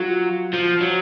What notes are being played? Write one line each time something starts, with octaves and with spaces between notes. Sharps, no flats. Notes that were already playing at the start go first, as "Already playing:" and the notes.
Already playing: F#3 F4
F3
F#3